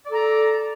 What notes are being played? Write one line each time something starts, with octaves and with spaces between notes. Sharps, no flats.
A4 D5 A#5